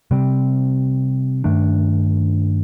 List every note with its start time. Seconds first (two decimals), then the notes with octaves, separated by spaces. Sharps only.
0.11 C3 G3 C4
1.44 G2 D#3 A3 D4